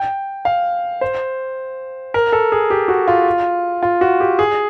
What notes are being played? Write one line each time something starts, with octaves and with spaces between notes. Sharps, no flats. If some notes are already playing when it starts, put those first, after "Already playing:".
Already playing: G5
F5
C5
A#4
A4
G#4
G4
F#4
F4
F4
F#4
G4
G#4